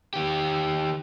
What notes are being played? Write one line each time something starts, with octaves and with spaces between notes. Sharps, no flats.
D#3 G4